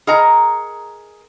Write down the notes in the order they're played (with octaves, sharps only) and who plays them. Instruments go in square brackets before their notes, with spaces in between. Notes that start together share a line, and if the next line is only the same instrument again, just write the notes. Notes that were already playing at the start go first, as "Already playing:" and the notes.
[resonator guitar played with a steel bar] G#4 A#4 D#5 F#5 A#5